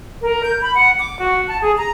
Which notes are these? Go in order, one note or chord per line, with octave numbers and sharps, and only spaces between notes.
A#4
G6
B5
F#5
D6
F#4
A5
G#4
A#5